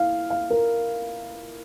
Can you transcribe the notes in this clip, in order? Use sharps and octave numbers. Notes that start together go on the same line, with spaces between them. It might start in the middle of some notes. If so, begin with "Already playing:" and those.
Already playing: E4 F5
F5
A#4